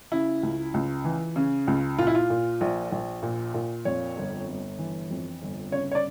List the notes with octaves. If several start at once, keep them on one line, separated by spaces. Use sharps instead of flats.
C#3 E4
C#2
C#2
E3
C#3
C#2
A#2 F4
E4
F4
A#2
A#1
A#1
A#2
A#2
F2 C#5
G1
G1
E3
F2
G1
C#3 C#5
C#5
D5